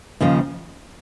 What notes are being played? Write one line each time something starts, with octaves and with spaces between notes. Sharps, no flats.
D#2 C#3 F3